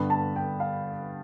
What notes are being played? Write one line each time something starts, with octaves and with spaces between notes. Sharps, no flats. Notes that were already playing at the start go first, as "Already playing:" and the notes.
Already playing: G2 D3 G3 B3 D4 B5
A5
G5
F5